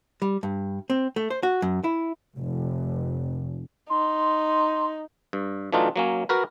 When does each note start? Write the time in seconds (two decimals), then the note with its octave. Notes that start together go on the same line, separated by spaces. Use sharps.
0.22 G3
0.43 G2
0.90 C4
1.16 A3
1.30 C5
1.43 F#4
1.62 F#2
1.84 E4
2.37 F1
3.90 D#4 C6
5.33 G2
5.72 E3 F#3 A3 D4 D#4 F4
5.96 F#3 A#3 C#4
6.29 F#4 A#4 B4